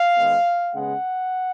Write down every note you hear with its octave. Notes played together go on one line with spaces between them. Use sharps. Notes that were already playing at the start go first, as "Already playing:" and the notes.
Already playing: F5
D#3 G#3 B3
C#3 G#3 B3 F#5